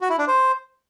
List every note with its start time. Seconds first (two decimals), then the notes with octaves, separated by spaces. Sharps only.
0.01 F#4
0.10 E4
0.19 D4
0.28 C5